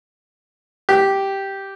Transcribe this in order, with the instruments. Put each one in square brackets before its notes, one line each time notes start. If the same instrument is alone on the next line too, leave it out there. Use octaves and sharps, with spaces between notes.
[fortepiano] G4